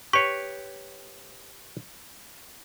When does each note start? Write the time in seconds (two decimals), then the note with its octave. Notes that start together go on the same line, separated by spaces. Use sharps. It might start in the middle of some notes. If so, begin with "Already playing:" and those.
0.13 G4 B4 C#5 C#6